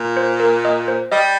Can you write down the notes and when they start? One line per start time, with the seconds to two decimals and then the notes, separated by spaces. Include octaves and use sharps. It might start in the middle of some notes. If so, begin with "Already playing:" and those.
Already playing: A#2
0.17 C5
0.40 A#4
0.65 D#5
0.88 C5
1.12 G3 D#5